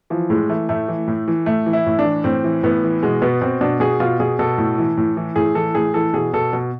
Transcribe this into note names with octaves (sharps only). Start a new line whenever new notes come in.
E3 F3
A2 G#3
E3 A3
A2 A3
E3
A2
E3
A2 A3
E3
E4
A2
D4
E3
A2 C4
E3
A2 B3
E3
B2 G#3
B2 B3
B2 C4
B2 D4
B2 G#4
B2 F4
B2 G#4
B2 A4
A2
E3
A2
E3
A2 G#4
E3 A4
A2 G#4
E3 A4
B2 G#4
B2 A4
B2